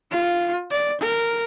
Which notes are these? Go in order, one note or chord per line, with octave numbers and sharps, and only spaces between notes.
F4
D5
A#4